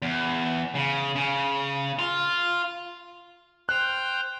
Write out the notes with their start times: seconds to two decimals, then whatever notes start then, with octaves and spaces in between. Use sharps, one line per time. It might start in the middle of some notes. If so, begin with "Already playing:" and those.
0.02 E2
0.75 C#3
1.15 C#3
1.99 F4
3.69 C5 G5 F6 F#6